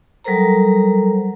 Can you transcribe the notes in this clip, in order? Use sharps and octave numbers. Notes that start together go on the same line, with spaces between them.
F#3 G3 A4 A#4 C5 A#5